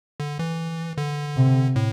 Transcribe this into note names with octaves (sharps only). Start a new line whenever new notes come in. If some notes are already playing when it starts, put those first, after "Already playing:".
D3
E3
D3
C3
A2